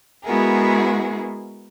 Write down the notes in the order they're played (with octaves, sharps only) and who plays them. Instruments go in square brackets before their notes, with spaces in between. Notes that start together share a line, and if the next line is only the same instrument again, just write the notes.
[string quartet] G#3 B3 E4 F#4 G#4 A#4